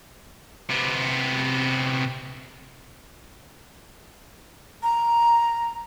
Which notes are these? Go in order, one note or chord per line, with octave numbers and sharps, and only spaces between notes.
C3 B3
A#5